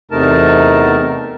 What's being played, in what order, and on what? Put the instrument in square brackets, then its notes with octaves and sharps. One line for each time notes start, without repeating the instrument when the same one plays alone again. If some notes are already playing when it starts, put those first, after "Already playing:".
[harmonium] E2 C3 A3 D#4 A#4 A5